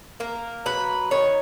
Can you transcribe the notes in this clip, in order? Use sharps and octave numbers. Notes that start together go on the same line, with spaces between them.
A#3 A#4
F#3 B4
D#3 C#5